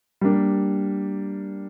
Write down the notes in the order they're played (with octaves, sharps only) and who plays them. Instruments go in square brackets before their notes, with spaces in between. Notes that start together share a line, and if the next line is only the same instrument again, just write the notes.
[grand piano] G3 A#3 D4